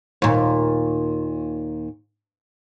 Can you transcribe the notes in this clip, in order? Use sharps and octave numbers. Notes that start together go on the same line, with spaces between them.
D#2 A#2